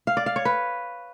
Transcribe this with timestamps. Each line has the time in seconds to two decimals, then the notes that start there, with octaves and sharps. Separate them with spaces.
0.07 F5
0.17 D5
0.26 F5
0.36 C#5
0.45 B4